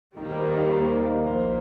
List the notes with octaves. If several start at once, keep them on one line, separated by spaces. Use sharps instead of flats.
D#2 D#3 G3 A#3 D#4 G4
G4 C5
A#4 D#5
C5 F5
C5 F5
A#4 D#5
A#1 A#2 A#3 C5 F5